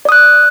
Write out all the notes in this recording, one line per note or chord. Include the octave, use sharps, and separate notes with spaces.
D5 D#6 F#6